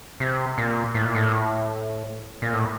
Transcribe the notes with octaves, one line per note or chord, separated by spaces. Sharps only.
C3
A#2
A2
A#2
A2
A#2
A2